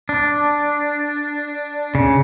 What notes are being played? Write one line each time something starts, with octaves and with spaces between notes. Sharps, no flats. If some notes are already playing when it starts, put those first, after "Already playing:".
D4
C#3